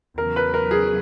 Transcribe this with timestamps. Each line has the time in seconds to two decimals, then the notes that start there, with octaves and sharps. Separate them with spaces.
0.17 E2 C#3 F#3 A#4
0.36 B4
0.54 A#4
0.71 G#4